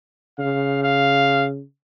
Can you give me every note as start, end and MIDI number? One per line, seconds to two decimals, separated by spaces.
0.39 1.61 49
0.39 0.80 77
0.83 1.46 77